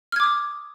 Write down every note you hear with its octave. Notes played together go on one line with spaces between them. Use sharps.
D6 D#6 F6 G#6